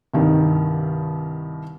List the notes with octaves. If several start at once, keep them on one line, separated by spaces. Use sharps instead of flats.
C2 G2 D#3